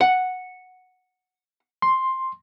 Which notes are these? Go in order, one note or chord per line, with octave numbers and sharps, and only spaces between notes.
F#5
C6